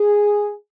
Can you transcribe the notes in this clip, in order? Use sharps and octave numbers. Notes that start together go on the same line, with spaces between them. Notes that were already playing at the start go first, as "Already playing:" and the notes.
Already playing: G#4